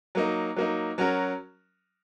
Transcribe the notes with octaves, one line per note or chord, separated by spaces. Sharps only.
F#3 A#3 D#4
F#3 A#3 D#4
F#3 C#4 F#4 A#4